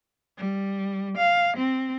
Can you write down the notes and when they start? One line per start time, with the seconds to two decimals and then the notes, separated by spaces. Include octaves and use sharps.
0.38 G3
1.18 F5
1.57 C4